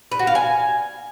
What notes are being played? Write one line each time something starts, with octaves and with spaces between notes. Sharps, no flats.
B4
F#4
F5
G#5